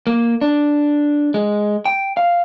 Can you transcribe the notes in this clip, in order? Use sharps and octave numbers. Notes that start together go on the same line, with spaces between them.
A#3
D4
G#3
G5
F5